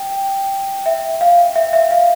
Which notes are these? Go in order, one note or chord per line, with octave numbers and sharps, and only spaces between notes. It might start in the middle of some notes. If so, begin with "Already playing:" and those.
Already playing: G5
E5
F5
E5
E5
F5